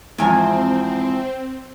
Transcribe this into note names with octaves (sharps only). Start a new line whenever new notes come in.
E2 G#2 F3 C4 G#5